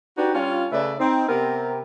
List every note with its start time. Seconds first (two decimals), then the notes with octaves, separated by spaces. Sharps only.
0.18 D4 D#4 F#4 G4 B4 D5
0.35 G3 C#4 D4 F4
0.72 C#3 A3 B4 D5 E5
1.00 C4 D#4
1.29 C3 B3 C4 G4 A#4